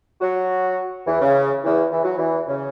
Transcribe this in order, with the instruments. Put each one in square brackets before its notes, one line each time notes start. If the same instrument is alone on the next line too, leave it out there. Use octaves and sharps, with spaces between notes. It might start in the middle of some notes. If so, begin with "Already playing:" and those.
[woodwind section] F#3 F#4
E2 E3
C#3
E2 E3
E3
F#3
E2 E3
C#3